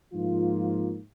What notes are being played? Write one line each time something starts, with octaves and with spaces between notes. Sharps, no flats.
G#2 F3 A#3 F4